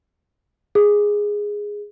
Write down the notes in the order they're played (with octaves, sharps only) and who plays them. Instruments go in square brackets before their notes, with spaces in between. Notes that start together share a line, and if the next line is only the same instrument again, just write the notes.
[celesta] G#4